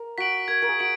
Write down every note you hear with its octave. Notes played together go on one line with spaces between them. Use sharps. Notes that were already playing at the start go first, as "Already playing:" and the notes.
Already playing: A#4
F#4 B6 D7 F#7
A#4 G#6
A#4
G#4
F#4 D7 F#7